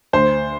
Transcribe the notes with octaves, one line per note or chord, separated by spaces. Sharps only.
D2 C5